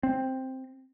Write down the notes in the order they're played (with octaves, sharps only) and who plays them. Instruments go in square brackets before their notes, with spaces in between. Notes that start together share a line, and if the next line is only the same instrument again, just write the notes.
[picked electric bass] C4